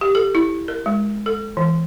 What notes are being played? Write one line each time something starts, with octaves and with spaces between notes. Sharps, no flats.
G4
A4
E4
A#4
G#3
A4
E3